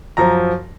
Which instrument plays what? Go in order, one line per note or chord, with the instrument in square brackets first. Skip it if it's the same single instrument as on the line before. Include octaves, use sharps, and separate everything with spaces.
[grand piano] F#2 F3 A#5